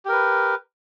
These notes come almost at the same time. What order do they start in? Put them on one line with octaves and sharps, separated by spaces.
G4 A#4 B4